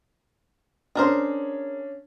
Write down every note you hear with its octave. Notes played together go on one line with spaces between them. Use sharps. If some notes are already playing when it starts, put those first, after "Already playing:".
C#4 D4 G#4 A#4 C5